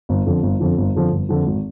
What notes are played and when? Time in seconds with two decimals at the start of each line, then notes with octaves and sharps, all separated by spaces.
0.09 G1
0.26 F2 D3 F3
0.42 G1
0.60 F2 D3 F3
0.78 G1
0.95 F2 D3 F3
1.11 G1
1.29 F2 D3 F3
1.46 G#1